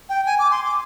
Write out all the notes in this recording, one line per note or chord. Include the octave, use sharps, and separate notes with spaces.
G5
G#5
D6
C6
D6